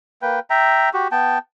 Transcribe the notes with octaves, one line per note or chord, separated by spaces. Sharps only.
A#3 B4 G5
E5 G5 A#5
F#4 G4
B3 G5 A5